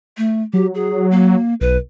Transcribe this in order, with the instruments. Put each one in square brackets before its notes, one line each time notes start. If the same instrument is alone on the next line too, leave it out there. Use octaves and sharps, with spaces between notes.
[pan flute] A3
[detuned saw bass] F#3 [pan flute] G4
[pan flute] G#4
A#3
[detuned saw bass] B1 [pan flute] B4